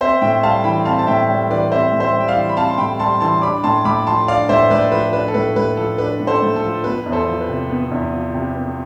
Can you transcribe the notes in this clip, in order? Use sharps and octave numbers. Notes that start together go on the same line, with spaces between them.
C4 C5 E5
A2 E5 G5
G3 F5 A5
E3 G5 B5
C4 F5 A5
A5
A2 E5 G5
G3
E3 B4 D5
C4 C5 E5
A2
C5 E5
G3
G5
D5 F5
E3
B5
C4 F5 A5
C6
A2 G5 B5
G3 A5 C6
E3 A5 C6
D4 B5 D6
A2 A5 C6
A3 B5 D6
F3 A5 C6
D4 D5 F5
A2 C5 E5
A3 B4 D5
F3 B4
D4 B4
A4
A2 B4
A3 B4
F3 A4
D4 B4
A2
A4 C5
A3
A4
F3
B3 B4
E2
A4 C5
F3
B4
C3
B3
E2
F3
C3
B3